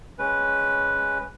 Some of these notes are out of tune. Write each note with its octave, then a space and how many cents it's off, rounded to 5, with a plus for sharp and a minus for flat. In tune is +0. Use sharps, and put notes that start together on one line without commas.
G#3 +0 C#4 +0 B4 +0